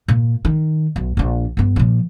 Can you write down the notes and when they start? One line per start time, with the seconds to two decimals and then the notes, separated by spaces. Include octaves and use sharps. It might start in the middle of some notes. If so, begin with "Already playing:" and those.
0.08 A#2
0.45 D#3
0.96 B1
1.17 A#1 D4
1.57 G1 B3
1.76 A#2 F3